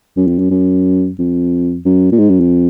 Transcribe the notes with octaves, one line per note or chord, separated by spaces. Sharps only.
F#2
F2
F#2
F#2
F2
F#2
A#2
G#2
F#2
F2